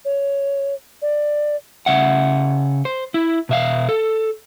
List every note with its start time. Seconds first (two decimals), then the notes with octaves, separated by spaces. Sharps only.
0.05 C#5
1.02 D5
1.86 C#3 E5 F#5
2.85 C5
3.14 E4
3.49 B2 E5 F5
3.89 A4